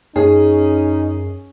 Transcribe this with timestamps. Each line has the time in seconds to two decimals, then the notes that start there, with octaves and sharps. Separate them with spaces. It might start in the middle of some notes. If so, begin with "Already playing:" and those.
0.16 F#2 C#4 D#4 G#4